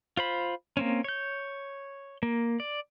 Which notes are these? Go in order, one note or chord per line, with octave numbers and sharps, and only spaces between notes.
F4 C5 B5
A#3 C4 C#4
C#5 G6
A#3
D5